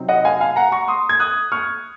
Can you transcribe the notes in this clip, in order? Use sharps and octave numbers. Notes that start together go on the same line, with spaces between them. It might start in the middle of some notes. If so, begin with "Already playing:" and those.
Already playing: C3 F#3 C4 D#4
D#5 F#5
F5 G#5
F5 G#5
F#5 A#5
A#5 C#6
C6 D#6
G#6
D#6 F#6
C#6 F6